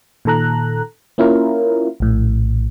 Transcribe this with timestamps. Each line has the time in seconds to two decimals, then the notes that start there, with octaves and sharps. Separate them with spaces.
0.25 A#2 D#3 A4 A#5 F#6
1.18 A#3 C#4 E4 F4 A#4
2.00 A#1 A2